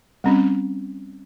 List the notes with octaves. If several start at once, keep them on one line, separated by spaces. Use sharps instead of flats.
G3 C4 C#4